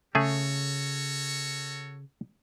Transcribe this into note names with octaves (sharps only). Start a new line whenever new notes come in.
C#3 A3 F#4 G#4 A4 C#5